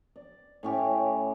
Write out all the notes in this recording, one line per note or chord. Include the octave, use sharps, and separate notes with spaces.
D5
A2 C#4 G4